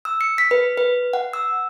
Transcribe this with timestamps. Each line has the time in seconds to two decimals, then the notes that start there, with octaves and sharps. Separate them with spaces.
0.05 E6
0.21 C#7
0.38 B6
0.51 B4
0.78 B4
1.13 F#5
1.33 E6